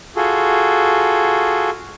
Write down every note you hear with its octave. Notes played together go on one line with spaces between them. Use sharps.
F4 F#4 G#4 A4